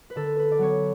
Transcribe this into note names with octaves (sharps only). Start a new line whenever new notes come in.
B4
D3 A4
B4
D5
F#3 B3 C#5